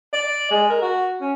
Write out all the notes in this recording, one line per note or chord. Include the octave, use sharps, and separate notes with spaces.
D5
G#3
A#4
F#4
C#4